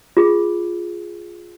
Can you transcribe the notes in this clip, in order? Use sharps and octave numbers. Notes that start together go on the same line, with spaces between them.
F4 G#4